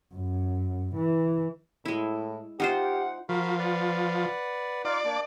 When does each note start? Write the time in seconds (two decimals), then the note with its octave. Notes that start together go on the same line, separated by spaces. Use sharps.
0.15 F#2
0.96 E3
1.85 A2 G#3 E4
2.60 D#4 F4 G4 C5 F#5
3.29 F3 F#4 A#4 B5
3.59 B4 D5 F#5
4.85 D#4 F4 D5 F5
5.05 A#3 D4